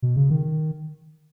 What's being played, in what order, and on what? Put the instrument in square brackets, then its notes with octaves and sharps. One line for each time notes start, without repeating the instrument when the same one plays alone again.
[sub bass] B2
C#3
D#3